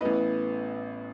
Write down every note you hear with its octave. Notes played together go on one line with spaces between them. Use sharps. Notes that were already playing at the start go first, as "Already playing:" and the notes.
A1 A2 E3 B3 B4 D#5